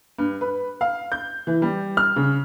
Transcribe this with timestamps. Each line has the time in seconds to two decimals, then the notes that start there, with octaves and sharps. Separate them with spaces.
0.19 G2
0.41 B4
0.81 F5
1.12 G6
1.47 E3
1.62 G3
1.97 F6
2.16 C#3